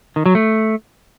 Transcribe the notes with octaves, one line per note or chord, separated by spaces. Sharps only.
D#3
F#3
A3